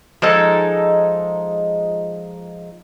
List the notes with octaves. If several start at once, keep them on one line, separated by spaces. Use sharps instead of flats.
F3 G#3 D#4 A4